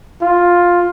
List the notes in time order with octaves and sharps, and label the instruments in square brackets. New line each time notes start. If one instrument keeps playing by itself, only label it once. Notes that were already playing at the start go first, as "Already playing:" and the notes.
[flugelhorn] F4